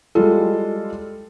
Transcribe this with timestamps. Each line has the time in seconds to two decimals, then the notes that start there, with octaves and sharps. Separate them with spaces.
0.15 G3 G#3 F4 A4